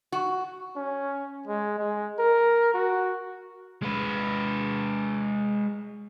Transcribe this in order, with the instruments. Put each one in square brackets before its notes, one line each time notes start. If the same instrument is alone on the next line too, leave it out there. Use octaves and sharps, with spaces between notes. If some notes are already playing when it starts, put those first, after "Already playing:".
[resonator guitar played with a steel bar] F#4
[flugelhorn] C#4
G#3
G#3
A#4
F#4
[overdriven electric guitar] G#3 B4